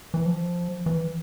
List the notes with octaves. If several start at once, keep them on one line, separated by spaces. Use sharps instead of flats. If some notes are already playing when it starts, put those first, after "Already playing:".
E3
F3
E3